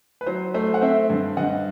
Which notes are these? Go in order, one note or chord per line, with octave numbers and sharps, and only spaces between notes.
B4
F#3 C5
A3 C5
F#5
C4 C5 E5
G2
G2 D#5 F#5